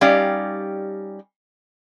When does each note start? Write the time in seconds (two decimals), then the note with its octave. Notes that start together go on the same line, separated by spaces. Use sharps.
0.01 G3 C#4 D#4 G4 D5 F5